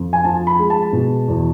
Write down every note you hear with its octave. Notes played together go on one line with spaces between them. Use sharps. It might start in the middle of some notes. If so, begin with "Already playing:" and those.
Already playing: F2
G#5
F3 A5
B5
G#3
A5
B2
E2